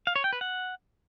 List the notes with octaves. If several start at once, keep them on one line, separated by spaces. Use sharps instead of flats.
F5
C#5
G5
B4
F#5